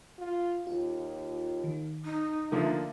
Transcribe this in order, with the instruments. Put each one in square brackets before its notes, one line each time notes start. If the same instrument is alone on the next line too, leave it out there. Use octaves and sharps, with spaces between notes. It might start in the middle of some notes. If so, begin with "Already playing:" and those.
[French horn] F4
[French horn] D#2 [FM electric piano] F4
[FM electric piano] D#3
[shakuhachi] D#4
[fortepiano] D3 F3 A#3 [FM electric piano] A3 E5 [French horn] D4